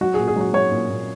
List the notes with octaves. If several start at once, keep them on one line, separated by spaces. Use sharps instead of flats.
F#3 F#4
A#2 G#4
G#4
F#3 F#4
F#3 C#5
A#2
A#2